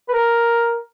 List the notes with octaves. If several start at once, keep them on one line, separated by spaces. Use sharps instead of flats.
B4
A#4